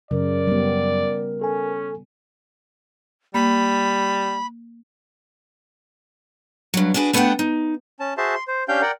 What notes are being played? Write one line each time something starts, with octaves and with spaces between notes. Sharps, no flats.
F#2 C#3 F#3 A#4 D5
G3 B3
C#4 A4 G#5
G3 A#3 B5
G2 F#3
D4 F#4 G#4 A#4 B4
A3 B3 D4 A#4 F#5 G5
D#4
C#4 A5
F#4 G#4 C5 E5 A5 C6
C6
C5
C#4 D4 G4 F5 G5 G6
A#4 D5 F#5 G5